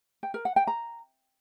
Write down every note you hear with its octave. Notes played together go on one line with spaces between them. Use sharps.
G5
A#4
F#5
G5
A#5